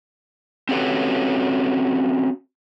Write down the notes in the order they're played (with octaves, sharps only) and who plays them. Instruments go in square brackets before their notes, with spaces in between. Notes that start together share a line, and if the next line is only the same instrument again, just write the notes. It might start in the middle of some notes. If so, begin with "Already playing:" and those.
[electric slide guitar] C4 C#4 F#4 G4 A4 B4